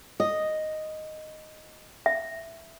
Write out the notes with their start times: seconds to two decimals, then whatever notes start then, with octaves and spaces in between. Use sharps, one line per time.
0.20 D#5
2.06 E5